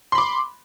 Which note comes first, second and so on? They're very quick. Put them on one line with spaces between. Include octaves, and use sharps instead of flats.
C6 B5 D6